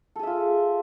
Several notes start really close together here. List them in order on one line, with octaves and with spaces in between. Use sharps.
A4 G#4 E5 F4